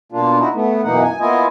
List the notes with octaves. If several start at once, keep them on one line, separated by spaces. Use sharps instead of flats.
B2 A#3 D4 F4
D#4 E4 F#4
A3 B3
F#2 B2 E3 A#3 D#4 F#5
G#5
A#3 B3 E4 F4 D#5 G#5